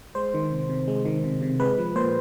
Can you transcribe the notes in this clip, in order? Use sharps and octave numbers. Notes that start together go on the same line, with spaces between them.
G#3 C5
D#3
C3
C3
G#3
D#3
C3
C3
G#3 B4
F3
A#2 C5